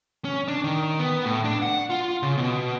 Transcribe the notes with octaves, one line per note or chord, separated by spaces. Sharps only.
C#4
D4
D#3
B3
A2
D4
F#5
F4
C#3
B2